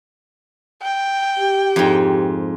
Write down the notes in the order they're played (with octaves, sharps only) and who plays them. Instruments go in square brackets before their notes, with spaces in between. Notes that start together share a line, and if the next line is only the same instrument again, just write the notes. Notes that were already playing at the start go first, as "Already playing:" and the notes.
[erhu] G5
[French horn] G4
[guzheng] F2 G#2